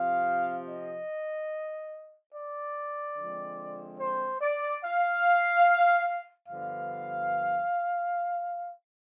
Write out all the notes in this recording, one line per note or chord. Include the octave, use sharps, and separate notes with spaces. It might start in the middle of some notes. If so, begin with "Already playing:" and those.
Already playing: C3 F3 C4 F5
D#5
D5
D3 F3 G#3 C4
C5
D5
F5
G2 D3 F3 B3 F5